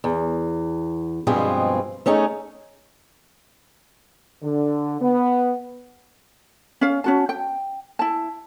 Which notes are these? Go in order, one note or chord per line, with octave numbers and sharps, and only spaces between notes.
E2
G2 B2 F3 G#3 C4 G#4
A3 C#4 D#4 G#4
D3
B3
C#4 F5
C#4 F#4 A5
G5
E4 A5